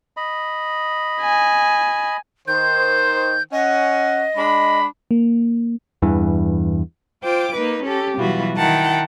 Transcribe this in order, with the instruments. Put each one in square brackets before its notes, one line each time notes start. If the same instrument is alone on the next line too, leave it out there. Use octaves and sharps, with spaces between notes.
[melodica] D#5 B5
[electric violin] G#5
[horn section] D#3 C5 [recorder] G6
[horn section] C#4 F#5 [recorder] D#5
[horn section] G#3 D4 B5
[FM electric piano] A#3
[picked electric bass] E2 G2 E3
[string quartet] F4 C5 G5 D6
A#3 D#4 B4
C#4 G4 A4
B2 E3 F#3 G3 F4 F#4
D#3 E4 F#5 G5 A5 A#5